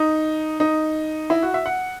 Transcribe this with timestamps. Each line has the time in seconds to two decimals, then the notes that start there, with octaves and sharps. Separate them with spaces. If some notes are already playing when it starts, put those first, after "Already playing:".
Already playing: D#4
0.60 D#4
1.30 E4
1.43 F#4
1.54 E5
1.66 F#5